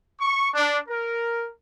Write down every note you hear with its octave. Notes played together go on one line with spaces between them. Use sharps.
C#6
D4
A#4